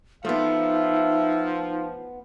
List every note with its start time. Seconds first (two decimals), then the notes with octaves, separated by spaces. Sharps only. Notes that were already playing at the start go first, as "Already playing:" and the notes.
0.25 F3 A3 B3 D#4 E5